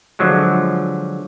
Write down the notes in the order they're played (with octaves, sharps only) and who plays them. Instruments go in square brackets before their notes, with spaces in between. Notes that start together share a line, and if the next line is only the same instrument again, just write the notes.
[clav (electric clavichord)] D3 F3 F#3 G#3